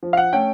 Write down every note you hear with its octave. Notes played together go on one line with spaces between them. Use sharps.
F3
F5
F#5
A3 C#4 G5